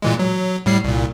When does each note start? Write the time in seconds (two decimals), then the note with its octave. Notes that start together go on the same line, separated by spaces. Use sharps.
0.02 A#2 E3 G#3
0.19 F#3
0.66 A2 G3 C7
0.84 C2 A#2